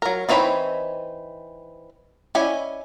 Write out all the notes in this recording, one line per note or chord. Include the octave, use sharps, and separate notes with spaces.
F#3 A#4
E3 C4 D#4 C#5 B5
C#4 E4 D5 D#5 G#5